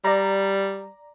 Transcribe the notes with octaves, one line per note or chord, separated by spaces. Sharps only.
G3 D5 A#5